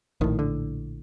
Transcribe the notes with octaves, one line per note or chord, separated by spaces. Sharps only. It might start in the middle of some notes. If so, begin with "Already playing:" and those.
A#1 A2 D#3
D3